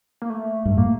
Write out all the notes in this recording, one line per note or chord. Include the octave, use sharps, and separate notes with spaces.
A#3
A3
G2
A2 A#3